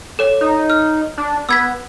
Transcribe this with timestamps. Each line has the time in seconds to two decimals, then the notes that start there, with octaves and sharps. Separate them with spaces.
0.19 A4 C#5
0.41 D#4
0.70 F6
1.18 D4
1.49 B3 E6 G#6 B6